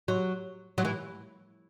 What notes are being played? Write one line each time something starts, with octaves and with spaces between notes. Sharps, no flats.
F#3
F#3
E3